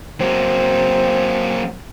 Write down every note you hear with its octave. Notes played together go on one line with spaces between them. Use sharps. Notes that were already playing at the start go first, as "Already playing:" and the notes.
F#3 A#3 C4